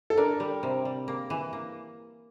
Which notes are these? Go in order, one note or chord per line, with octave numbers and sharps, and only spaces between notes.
A4
D4 A#4
G3
C3
G3
A#3
E3
A#3